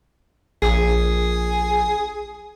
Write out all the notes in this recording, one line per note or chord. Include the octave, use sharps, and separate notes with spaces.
A#1 G#4